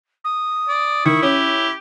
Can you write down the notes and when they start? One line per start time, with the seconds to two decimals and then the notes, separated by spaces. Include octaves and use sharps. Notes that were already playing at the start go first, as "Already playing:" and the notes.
0.24 D#6
0.68 D5
1.06 D#3 E4 C#6
1.23 C#4 G4